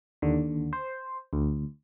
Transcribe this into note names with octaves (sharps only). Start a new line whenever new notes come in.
D#2 D3
C5
D2